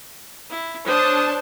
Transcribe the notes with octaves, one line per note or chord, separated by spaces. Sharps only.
E4
D4 C5 C#5 A5 D#6